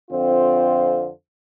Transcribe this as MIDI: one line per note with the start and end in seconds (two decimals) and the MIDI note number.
0.10 1.09 41
0.10 1.09 50
0.10 1.09 60
0.10 1.09 65
0.10 1.09 72